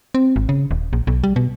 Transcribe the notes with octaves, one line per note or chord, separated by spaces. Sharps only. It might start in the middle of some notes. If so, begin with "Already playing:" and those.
C4
G#1
C#3
D#1
A#1
B1
G3
B2